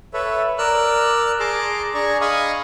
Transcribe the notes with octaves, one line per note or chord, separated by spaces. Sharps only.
A4 B4 C#5 E5
A#4 D5 E6 F#6
G#4 A5 A#5 C6 D6
D4 G#4 D5 G#5 A#5 C#6
D#5 F5 G#5 B5 C#6 D#6